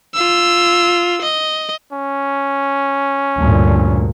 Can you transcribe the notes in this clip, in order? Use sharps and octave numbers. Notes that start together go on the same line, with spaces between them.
F4 E6
D#5
C#4
D2 G2 A#2